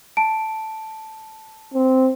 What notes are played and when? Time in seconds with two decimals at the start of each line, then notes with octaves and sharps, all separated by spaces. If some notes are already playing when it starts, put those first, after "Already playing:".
0.17 A5 D7
1.74 C4